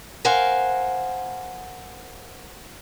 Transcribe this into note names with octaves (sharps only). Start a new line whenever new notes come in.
A#4 C5 F5 F#5 G#5